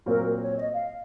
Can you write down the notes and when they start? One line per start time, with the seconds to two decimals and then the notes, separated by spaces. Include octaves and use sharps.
0.06 A#2 F#3 C4 F4 A#4
0.41 C#5
0.57 D#5
0.74 F5